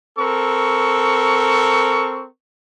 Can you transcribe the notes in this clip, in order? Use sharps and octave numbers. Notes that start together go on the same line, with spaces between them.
C4 A4 A#4 C#6